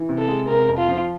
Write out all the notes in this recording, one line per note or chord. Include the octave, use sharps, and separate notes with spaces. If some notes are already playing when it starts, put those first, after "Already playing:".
Already playing: E3
C3
A4
G#3
C3 A#4
F2
F4
F3